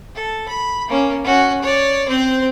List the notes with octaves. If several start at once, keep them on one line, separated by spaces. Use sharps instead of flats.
A4
B5
A#3 C#4
C#4 F#4
C#5 D5
C4 C5